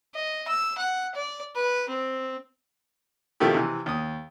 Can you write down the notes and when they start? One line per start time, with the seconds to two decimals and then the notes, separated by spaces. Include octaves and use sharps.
0.15 D#5
0.48 E6
0.78 F#5
1.15 D5
1.56 B4
1.89 C4
3.40 B2 D#3 F3 A3 E4 G4
3.54 C3 E3
3.86 D#2 D#6